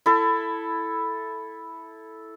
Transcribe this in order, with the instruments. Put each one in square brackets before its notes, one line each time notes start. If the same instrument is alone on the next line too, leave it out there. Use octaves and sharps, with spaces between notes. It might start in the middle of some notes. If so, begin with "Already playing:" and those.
[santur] E4 A4